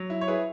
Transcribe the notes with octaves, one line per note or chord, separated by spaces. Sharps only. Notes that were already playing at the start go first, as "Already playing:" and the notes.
Already playing: F#3
E4
C#5
E4 G#4 B4